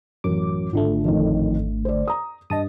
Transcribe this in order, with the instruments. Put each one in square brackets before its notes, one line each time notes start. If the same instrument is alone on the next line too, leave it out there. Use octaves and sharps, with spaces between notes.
[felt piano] A1 F#2 [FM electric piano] D6
[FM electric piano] G#1 D3 A3 [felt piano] F4
[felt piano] F2 A2 D#3
C5 D5
A#5 D#6
[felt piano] G2 [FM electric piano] D#5 A5 D#6